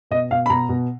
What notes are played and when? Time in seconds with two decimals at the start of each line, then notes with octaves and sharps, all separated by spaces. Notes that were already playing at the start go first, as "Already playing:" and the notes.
0.11 B2 D#5
0.31 B2 F5
0.46 B5
0.50 B2 A#5
0.69 B2